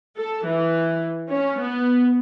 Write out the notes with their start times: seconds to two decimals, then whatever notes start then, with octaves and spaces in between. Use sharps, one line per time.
0.18 A4
0.48 E3
1.31 C#4
1.61 B3